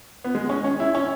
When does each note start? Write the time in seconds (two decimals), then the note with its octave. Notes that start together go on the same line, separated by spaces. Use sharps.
0.24 B3
0.35 G#3
0.49 C#4
0.64 C#4
0.80 E4
0.95 C#4